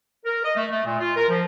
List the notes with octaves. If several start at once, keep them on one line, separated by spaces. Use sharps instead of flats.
A#4
D#5
A3
A3
A#2
F4
A#4
F3